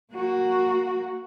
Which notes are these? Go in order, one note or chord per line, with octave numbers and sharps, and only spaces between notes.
A#3 F#4